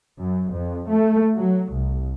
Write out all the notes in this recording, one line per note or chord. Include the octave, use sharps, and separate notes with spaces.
F#2
F2
A3
F#3
C2